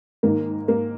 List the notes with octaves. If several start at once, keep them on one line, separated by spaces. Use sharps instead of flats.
G#2 D#3 A#3
A#3